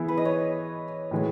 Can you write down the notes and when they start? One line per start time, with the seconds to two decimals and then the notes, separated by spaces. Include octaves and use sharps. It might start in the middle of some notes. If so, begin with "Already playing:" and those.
Already playing: E3 B3 E4 G#4
0.08 B4
0.17 D#5
0.25 C#5
1.11 A2 E3 G#3